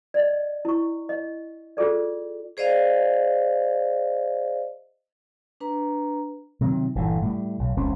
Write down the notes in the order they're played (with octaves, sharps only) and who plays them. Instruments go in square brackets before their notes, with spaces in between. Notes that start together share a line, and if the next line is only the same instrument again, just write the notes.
[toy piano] D5 D#5
E4 C#6
D#5
F4 G#4 A4 D5
[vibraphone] G#4 C5 D5 D#5 F5
D4 B4 A#5
[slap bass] C3 D#3 F#3
G1 A#2 D3 E3
A2 G3
B1
F1 C#2 F3 C#4